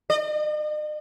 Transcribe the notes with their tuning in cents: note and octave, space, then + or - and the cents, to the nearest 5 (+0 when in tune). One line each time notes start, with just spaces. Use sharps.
D#5 -45